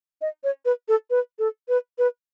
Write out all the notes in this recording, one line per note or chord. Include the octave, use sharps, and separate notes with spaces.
D#5
C#5
B4
A4
B4
A4
B4
B4